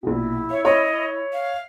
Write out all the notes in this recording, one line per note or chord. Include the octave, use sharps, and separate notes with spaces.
A#1 B2 E4
C#5 E5
C#5 D#5
F5